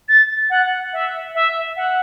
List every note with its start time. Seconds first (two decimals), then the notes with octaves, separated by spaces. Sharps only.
0.08 A6
0.50 F#5
0.93 E5
1.34 E5
1.76 F#5